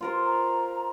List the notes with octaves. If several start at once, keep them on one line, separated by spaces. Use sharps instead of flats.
F4 A#4 C5
A#5